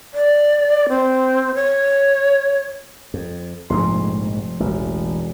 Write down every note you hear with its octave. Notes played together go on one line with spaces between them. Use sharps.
D5
C4
C#5
F2
F1 A#1 G#2 G#3 C6
E1 A1